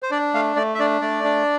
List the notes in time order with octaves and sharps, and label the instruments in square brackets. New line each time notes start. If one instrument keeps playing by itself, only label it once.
[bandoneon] C5
D4 D5
A3 F5
A3 D5
E5
D4 D5
A3 D5
D4